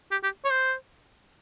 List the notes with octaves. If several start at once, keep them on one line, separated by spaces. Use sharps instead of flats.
G4
G4
C#5
C5